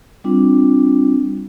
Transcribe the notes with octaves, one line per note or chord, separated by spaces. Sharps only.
G3 C4 D4 F4